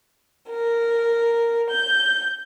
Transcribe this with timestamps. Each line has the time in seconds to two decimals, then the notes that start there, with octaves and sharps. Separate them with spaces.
0.50 A#4
1.70 G6